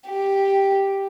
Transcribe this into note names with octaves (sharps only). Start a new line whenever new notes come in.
G4